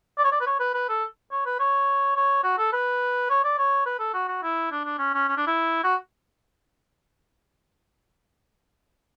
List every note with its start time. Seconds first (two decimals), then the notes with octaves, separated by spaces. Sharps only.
0.18 D5
0.24 C#5
0.32 D5
0.41 B4
0.47 C#5
0.60 B4
0.74 B4
0.89 A4
1.32 C#5
1.46 B4
1.59 C#5
2.16 C#5
2.44 F#4
2.58 A4
2.73 B4
3.30 C#5
3.44 D5
3.58 C#5
3.86 B4
3.99 A4
4.14 F#4
4.28 F#4
4.43 E4
4.71 D4
4.84 D4
4.99 C#4
5.14 C#4
5.28 C#4
5.37 D4
5.47 E4
5.84 F#4